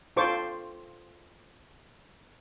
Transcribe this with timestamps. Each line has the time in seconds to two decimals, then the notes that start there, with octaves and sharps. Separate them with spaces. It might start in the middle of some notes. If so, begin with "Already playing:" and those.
0.17 F4 A4 C5 C#6 D6